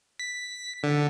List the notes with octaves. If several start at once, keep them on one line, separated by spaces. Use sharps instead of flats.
B6
D3